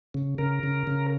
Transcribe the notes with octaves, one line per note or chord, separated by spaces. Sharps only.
C#3
C#3 A#4
C#3
C#3